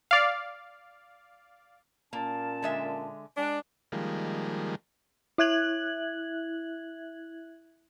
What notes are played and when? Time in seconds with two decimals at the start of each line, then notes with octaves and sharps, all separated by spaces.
0.11 D5 F5
2.13 A#2 A#3 C#4 A5
2.62 D3 G#3 E5
3.37 G#3 D4
3.92 D#3 F3 G3 G#3 A#3
5.38 E4 E5 F#6 G#6 F#7